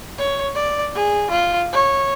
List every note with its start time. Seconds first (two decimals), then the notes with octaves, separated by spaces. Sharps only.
0.18 C#5
0.55 D5
0.95 G#4
1.31 F4
1.72 C#5